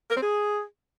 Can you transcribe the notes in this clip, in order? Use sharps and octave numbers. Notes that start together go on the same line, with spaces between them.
A#4
C4
G#4